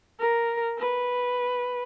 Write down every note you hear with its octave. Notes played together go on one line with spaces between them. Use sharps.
A#4
B4